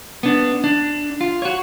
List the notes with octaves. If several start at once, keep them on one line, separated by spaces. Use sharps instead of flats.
B3 D4
D4
F4
F#4 C#5